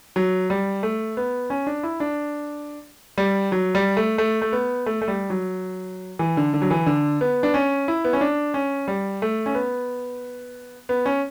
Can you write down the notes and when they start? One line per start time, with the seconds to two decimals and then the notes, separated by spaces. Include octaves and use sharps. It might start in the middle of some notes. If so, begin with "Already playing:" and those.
0.16 F#3
0.50 G3
0.83 A3
1.17 B3
1.50 C#4
1.67 D4
1.83 E4
2.00 D4
3.18 G3
3.52 F#3
3.75 G3
3.97 A3
4.18 A3
4.42 A3
4.53 B3
4.86 A3
5.02 A3
5.08 G3
5.30 F#3
6.19 E3
6.37 D3
6.54 D3
6.62 F#3
6.71 E3
6.86 D3
7.21 B3
7.43 D4
7.54 C#4
7.88 E4
8.05 B3
8.13 C#4
8.21 D4
8.54 C#4
8.88 G3
9.22 A3
9.46 C#4
9.55 B3
10.89 B3
11.06 C#4